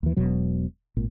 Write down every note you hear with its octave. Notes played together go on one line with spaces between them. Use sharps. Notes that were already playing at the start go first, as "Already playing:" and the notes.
D#2 E3
E1 B2 F#3
G#1 A#2